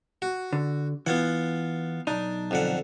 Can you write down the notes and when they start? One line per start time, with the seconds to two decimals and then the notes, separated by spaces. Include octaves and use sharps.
0.22 F#4
0.53 D3
1.06 E3 B3 F4 F#5
2.07 B1 D4 D#4
2.51 F2 D3 F#5